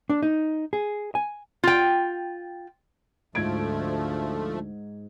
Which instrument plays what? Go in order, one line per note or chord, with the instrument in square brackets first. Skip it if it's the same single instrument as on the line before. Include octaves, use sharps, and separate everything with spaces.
[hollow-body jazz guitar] D4
D#4
G#4
G#5
[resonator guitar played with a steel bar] F4 G5
[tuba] D2 [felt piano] G#2 G#6 D7 [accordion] F3 A3